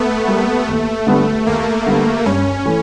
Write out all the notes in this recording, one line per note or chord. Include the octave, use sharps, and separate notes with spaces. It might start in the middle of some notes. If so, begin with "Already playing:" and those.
Already playing: A3 B3
G3 A#3
D#2
D3 G3 B3
D#2 A#3
D3 G3 B3
G2 C#4
E3 A3